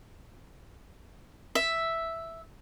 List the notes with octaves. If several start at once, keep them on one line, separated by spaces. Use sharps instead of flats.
E5